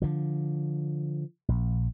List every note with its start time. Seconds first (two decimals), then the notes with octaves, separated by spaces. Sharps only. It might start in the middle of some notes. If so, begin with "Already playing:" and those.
0.02 D3 F3
1.49 A#1